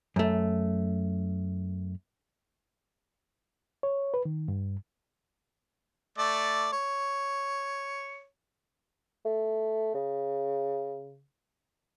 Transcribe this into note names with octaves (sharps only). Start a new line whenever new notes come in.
F#2 A3
C#5
B4
D#3
G2
A3 D5
C#5
A3
C#3